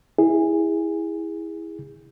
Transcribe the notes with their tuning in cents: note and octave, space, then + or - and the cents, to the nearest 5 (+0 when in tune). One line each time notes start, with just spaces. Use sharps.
E4 -10 G#4 -20